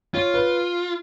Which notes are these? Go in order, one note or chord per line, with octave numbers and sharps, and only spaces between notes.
F4 C#5
B4